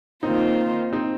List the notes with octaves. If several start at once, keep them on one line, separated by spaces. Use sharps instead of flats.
D#3 A#3 C4 D#4 F4 C5
C4 D#4